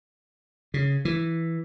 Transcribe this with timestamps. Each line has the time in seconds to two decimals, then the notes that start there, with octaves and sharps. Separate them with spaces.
0.74 C#3
1.05 E3